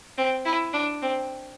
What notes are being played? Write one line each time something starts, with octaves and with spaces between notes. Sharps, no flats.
C4
E4
D4
C4